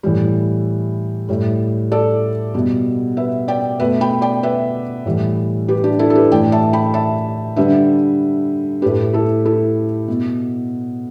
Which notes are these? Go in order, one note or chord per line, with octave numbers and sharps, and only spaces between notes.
A2 E3 G3
A2 G3
A4 D5
B2 G3
B4 E5
D5 G5
B2 A3 B4 E5
G5 B5
D5 G5
B4 E5
A2 E3 G3
G4 B4
D4 G4
E4 A4
A4
G4 B4
A2 E3 A3 D5 G5
E5 A5
G5 B5
E5 A5
D3 G3 B4 E5
A2 A3 G4 B4
E4 A4
E4 A4
B2